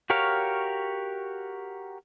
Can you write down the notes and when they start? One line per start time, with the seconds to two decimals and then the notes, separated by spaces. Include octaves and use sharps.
0.10 F#4 G4 A#4 C#5 F5